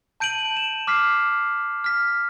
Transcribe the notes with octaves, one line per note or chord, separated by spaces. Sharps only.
A5 G6 D7 D#7 F#7
E7
D6 F6 B6 C7 E7
F6 B6